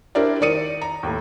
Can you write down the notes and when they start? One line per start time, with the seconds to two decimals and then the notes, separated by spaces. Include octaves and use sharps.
0.15 D4 E4 G4 A#4 C5 D5
0.41 D#3 A#4 D5 D#6 C#7 D#7
0.81 A#5
1.03 D#2 A2